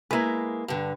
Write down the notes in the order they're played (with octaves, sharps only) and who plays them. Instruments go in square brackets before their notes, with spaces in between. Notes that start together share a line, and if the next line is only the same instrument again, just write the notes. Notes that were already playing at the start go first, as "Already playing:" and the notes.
[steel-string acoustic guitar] G#3 A#3 [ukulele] E4 B4
[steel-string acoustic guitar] G2 D3